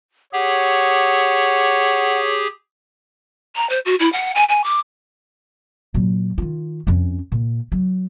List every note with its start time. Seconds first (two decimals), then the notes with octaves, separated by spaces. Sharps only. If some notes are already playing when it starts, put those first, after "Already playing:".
0.33 G4 G#4 C#5 F#5
3.56 A#5
3.70 C5
3.85 F#4
4.00 E4
4.13 F#5
4.35 G#5
4.49 G#5
4.64 D6
5.94 A#2 F#3
6.38 D#3 F4
6.87 F2 C#4
7.32 A#2
7.72 F#3